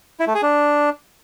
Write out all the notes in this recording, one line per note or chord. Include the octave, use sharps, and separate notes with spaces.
E4
A3
G#4
D4